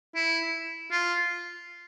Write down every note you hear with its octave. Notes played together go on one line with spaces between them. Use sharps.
E4
F4